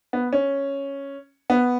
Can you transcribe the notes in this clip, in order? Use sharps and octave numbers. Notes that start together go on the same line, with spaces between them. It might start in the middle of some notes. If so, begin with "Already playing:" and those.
B3
C#4
B3